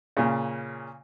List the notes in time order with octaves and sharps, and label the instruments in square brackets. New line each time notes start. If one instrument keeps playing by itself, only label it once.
[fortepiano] A#2 C#3